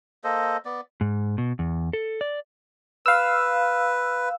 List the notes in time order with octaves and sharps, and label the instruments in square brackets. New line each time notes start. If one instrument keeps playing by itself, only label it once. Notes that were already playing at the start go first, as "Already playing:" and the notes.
[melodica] A#3 A4 C5 D#5
B3 D5
[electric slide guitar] G#2
B2
E2
A4
D5
[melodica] B4 [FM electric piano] F5 E6